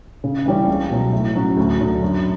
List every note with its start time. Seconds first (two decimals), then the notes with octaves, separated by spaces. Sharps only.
0.24 C#3
0.45 E3 G3 C#4
0.67 C#2
0.91 B2 F#3
1.12 A2
1.35 F#3 C#4 F#4
1.57 D2
1.80 D3 F#3
2.02 F#2